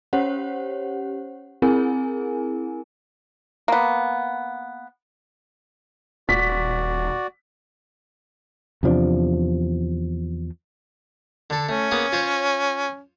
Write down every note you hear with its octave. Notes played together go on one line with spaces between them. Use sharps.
C#4 G4 C5 C#5 F#5
C4 E4 G#4 A#4 G#5
A#3 B3
D#1 F#4 D5 B6
E2 C3 F3 D4
D3 A4
A3 C#4
A#3 B3 G#4
F4 C5 C#5